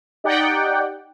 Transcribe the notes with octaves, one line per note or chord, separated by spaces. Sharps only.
D#4 G4 D5 F#5 G5